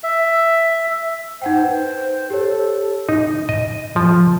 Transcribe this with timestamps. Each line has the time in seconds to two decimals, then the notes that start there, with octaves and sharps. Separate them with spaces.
0.03 E5
1.42 D#4 C5 F#5 G5
1.63 B4
2.30 G4 A4 C#5
3.09 D#4
3.49 D#5
3.96 F3